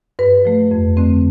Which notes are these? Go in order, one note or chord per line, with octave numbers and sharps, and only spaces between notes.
G2 B4
F3 A3
F2
D3 A3 C4